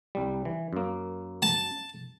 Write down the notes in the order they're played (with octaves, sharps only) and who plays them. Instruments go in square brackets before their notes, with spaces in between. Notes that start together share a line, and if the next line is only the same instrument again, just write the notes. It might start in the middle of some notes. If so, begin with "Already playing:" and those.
[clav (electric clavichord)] C2 G3
E3
F#2 A#3
[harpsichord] A5